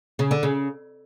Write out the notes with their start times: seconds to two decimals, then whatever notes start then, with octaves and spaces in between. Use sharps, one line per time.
0.19 C#3
0.31 D3
0.43 C#3